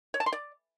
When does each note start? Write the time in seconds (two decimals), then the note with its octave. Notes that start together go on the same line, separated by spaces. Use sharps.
0.14 C#5
0.20 A5
0.26 C6
0.33 D5